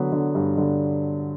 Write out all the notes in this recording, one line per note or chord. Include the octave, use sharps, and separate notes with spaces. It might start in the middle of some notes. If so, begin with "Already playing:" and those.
Already playing: D3 F#3 B3
D3
G2
D3